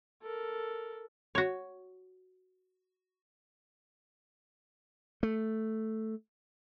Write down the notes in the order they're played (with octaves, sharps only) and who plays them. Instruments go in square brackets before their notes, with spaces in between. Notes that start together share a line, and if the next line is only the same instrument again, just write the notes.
[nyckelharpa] A4 A#4
[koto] F#4 C#5
[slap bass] A3